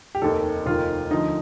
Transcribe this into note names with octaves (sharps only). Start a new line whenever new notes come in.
G4
F1 D#2 D#3 A4
F1 D#2 D#3 F4
D2 D3 F3 D#4